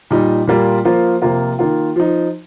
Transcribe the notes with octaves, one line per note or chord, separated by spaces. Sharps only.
A#2 G3 D#4
A#2 G3 A#3 F4
F3 A#3 F4
C3 F3 A#3 F4
D#3 A#3 F4
F3 D#4